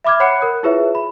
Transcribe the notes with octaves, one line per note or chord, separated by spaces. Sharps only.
E5 B5 D6 F6 G#6
C#5 F#5 B5 F#6 C7 C#7
A#4 D#6 F#6
E4 F4 G#4 B4 C#5 E5
B5